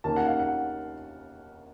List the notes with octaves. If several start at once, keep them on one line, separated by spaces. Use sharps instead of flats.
D#2 D#3 A#3 C#4 A5
F#5
F5
F#5